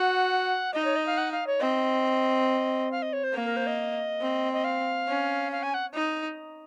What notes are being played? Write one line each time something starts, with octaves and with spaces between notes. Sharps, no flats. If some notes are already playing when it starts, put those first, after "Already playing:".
Already playing: F#4 F#5
D#4 D#5
C#5
D#5
F5
F#5
F5
C#5
C4 D#5
F5
D#5
C#5
C5
A#3
A#4
C5
D#5
C4
D#5
F5
C#4
F5
G#5
F#5
D#4